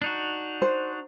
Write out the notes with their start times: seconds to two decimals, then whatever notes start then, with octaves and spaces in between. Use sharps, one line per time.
0.02 D4 D#4 F#4
0.62 C5